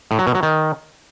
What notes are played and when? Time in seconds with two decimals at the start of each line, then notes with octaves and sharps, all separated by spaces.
0.11 A2
0.19 F#3
0.27 B2
0.35 F#3
0.43 D#3